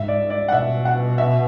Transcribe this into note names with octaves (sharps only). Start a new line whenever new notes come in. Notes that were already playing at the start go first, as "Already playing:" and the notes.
Already playing: G#2 E5
D5
D5
F#5
B2 E5
F#5
E5